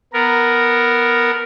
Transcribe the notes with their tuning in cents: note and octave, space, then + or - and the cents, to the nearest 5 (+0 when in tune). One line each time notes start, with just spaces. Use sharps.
B3 +0 A#4 +0